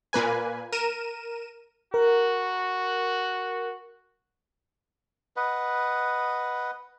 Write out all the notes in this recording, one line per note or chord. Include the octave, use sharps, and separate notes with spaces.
A#2 A#3 B4 G#5
A#4 D#7 E7
F#4 A#4
B4 D#5 F#5